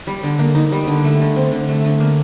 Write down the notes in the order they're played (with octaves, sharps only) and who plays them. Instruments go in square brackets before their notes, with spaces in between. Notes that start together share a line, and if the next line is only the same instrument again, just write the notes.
[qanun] G3
D3
A#3
D#4
G3
D3
A3
D3
C4
D3
A3
D3
A#3